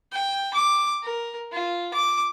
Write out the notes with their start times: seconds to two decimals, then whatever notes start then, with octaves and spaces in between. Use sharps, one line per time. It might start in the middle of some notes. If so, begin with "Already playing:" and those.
0.12 G5
0.54 D6
1.03 A#4
1.52 F4
1.94 D6